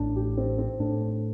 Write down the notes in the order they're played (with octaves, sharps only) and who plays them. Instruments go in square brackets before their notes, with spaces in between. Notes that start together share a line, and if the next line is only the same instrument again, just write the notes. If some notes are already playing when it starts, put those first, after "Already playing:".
Already playing: [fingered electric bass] A1 A2 [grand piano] D4
[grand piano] G4
C4
C4
[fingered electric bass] A2 [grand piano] D4